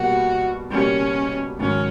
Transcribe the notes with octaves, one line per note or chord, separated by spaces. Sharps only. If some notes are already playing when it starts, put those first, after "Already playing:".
Already playing: B2 G3 A#3 F#4
B2 G3 A#3 C#4
G#2 D#3 F#3 C#4